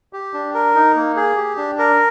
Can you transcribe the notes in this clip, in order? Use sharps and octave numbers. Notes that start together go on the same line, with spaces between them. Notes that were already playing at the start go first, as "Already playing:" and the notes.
G4
D4
A#4
D#4
A#3
G#4
G4
D4
A#4